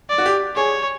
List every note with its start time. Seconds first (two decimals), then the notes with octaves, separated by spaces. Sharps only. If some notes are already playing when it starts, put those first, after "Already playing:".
0.09 D5
0.18 F#4
0.25 G4
0.56 G#4 C#5